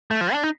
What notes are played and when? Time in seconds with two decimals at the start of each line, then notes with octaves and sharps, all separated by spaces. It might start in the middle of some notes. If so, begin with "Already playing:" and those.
0.11 A3
0.21 F3
0.33 D4
0.43 D#4